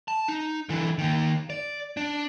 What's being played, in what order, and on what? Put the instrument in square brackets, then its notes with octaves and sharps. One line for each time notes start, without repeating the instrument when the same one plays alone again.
[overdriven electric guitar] A5
D#4
D3 E3
D#3 A#3
D5
D4